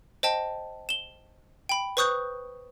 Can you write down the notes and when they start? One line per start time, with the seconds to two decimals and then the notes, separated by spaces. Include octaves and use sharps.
0.23 C5 D#5 G5 A5
0.89 E7 G7
1.69 G5 B5
1.97 B4 C5 C#6 D#6 F#6 G6